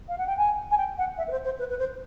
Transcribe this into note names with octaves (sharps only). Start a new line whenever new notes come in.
F5
F#5
G5
G#5
G#5
G5
F#5
E5
B4
C5
C5
B4
B4
C5